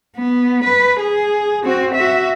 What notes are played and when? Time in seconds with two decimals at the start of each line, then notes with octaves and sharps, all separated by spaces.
0.17 B3
0.64 B4
1.00 G#4
1.65 C4 F#4
1.95 F#4 E5